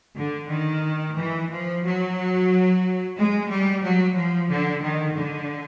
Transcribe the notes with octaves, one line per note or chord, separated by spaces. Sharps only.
D3
D#3
E3
F3
F#3
G#3
G3
F#3
F3
D3
D#3
D3